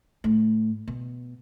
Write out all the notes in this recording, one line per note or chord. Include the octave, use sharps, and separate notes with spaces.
A2
B2